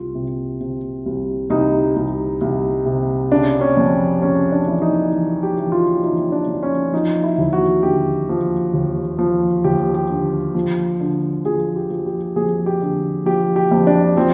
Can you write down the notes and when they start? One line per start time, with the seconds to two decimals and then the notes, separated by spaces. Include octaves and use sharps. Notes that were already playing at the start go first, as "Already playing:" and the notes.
Already playing: C2 F4
0.15 C3
0.61 C3
1.06 C2
1.50 C2 D#4
1.96 C2
2.41 C2
2.85 C3
3.32 C#3 D4
3.61 C#4
3.77 F2
4.22 C#3 C#4
4.52 D4
4.68 E3
4.82 D#4
5.12 E3
5.43 G4
5.57 E3
5.72 F4
6.03 E3 D#4
6.32 D4
6.47 F2
6.63 C#4
6.92 F3 D#4
7.23 E4
7.38 D#2
7.53 F#4
7.83 D3 G4
8.29 F3
8.74 D#2
9.19 F3
9.64 D#2 G4
9.94 G4
10.10 D3
10.55 F3
11.01 D3
11.45 F3 G#4
11.76 G4
11.90 F3
12.06 G4
12.36 F2 G#4
12.66 G4
12.82 D3
13.26 F3 G4
13.56 G4
13.71 F2
13.87 D4
14.17 F3 C4